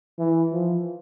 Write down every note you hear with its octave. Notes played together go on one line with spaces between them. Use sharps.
E3
F3